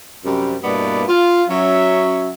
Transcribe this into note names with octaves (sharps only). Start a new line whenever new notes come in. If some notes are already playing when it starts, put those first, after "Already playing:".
F#2 C3 G3
G2 B2 A#3 B3 E4 D5
F4
F#3 C#4 E5